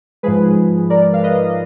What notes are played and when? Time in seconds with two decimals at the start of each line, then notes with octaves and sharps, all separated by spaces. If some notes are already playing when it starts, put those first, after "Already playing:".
0.23 G#2 F3 G#3 G#4 B4
0.90 A#4 D5
1.13 F5
1.23 B4 D#5